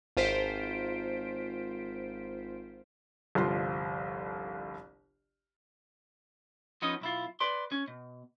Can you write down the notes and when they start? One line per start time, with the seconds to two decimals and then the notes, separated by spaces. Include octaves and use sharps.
0.17 G#1 F4 C5 B6 D7
3.35 G1 C2 F3 F4 C6
6.82 F3 B3 C#4 D#4 D#5
7.01 B1 E4 F4
7.40 B4 D5 C6
7.72 C#4
7.88 B2